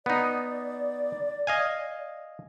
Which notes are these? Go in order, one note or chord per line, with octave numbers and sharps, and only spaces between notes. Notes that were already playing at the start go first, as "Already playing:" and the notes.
B3 D#4 D5
D#5 F5 G#5